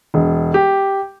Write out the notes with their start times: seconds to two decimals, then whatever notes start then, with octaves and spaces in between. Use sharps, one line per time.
0.14 E1
0.54 G4